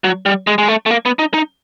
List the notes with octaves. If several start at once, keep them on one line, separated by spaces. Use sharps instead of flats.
F#3
G3
G#3
G#3
A3
A3
A#3
B3
D#4
D#4